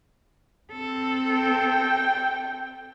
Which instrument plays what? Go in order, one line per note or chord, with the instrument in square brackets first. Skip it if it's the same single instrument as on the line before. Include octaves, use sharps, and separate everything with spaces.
[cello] C4 A4
[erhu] G5